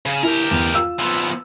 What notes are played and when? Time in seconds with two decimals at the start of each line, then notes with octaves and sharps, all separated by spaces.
0.06 C#3
0.23 E4 G4 A#4
0.51 E2
0.74 F4 E6
0.99 F3 B3